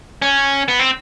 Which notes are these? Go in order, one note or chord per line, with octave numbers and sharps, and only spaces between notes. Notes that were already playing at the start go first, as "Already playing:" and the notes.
C#4
B3
C4